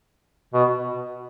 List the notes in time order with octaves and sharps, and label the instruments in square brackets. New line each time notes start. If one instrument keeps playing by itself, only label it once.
[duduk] B2